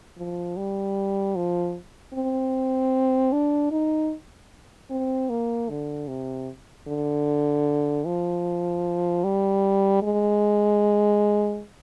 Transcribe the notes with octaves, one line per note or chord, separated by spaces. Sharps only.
F3
G3
F3
C4
D4
D#4
C4
A#3
D3
C3
D3
F3
G3
G#3